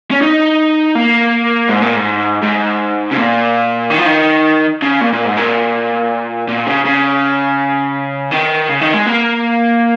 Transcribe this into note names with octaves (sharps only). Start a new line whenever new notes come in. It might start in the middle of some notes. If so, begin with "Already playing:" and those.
C#4
D#4
A#3
G#2
A#2
G#2
G#2
C#3
A#2
D#3
F3
D#3
C#3
A#2
A#2
G#2
A#2
A#2
C#3
C#3
D#3
C#3
D#3
G#3
A#3